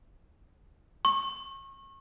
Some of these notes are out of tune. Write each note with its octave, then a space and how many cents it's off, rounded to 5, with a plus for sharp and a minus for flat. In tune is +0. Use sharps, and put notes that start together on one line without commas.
C#6 -30